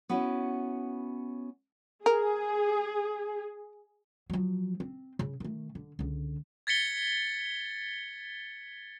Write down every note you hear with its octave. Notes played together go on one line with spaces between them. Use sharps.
B3 C#4 E4 F#4 C#5
G#4 A#4
F3 F#3
C4
C#3
D#3 A3
D3
C#2 D3
G#6 A6 B6 C#7 G7